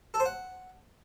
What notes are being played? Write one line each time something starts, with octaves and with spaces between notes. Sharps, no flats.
A4
C5
F#5